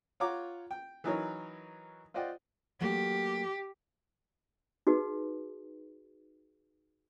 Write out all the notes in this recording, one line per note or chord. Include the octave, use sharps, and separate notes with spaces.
F4 C#5 F#5 A#5 D6
G5
E3 F#3 D#4 E4 A#4 C#5
F4 C5 D5 D#5 F#5 G5
F#3 A3 A#3 G4
D#4 F#4 G#4 B4